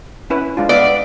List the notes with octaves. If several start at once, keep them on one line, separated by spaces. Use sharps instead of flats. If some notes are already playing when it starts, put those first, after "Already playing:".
C#4 E4 B4
G#3 D4 F4
B3 D5 E5 F5